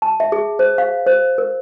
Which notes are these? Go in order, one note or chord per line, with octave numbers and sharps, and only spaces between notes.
A5
E5
G#4
C5
F5
C5
A#4